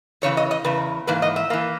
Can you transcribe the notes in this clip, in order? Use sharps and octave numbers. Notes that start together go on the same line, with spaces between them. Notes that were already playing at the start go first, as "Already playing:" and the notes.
E2 C#3 E3 C#5
D#5
D#5
E2 C#3 B4
G#2 E3 A#3 B4
D#5
E5
E3 A#3